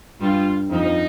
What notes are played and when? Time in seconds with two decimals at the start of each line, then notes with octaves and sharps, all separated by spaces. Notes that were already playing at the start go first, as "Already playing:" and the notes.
0.21 G2 G3 F4
0.71 F2 F3 D#4